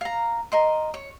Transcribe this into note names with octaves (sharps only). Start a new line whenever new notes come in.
F5 A#5
A#4 D#5 C6
C#5